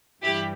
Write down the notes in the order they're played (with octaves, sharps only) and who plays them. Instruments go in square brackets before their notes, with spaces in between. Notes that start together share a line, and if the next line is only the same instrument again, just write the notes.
[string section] G2 E3 G3 E4 G4